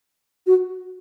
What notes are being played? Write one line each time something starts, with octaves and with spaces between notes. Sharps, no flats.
F#4